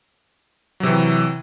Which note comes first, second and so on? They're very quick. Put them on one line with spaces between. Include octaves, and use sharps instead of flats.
F#3 C3 E3